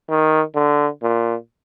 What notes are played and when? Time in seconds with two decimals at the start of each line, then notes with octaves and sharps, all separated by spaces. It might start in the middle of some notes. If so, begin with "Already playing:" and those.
0.09 D#3
0.55 D3
1.02 A#2